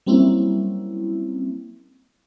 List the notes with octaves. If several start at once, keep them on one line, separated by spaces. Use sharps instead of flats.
F#3 G3 A#3 C4 C#4 E4